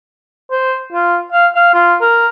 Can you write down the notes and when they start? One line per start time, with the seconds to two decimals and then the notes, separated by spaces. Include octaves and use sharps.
0.51 C5
0.93 F4
1.32 F5
1.55 F5
1.74 F4
2.01 A#4